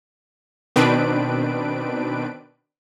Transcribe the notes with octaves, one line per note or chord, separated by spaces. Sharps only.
B2 D#3 C4 D4 B4 D7